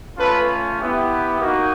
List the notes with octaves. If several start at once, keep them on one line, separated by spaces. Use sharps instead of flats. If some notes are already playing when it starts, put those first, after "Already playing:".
A3 C#4 F4 A4 B4
B3 E4 G4
A#3 D#4 F#4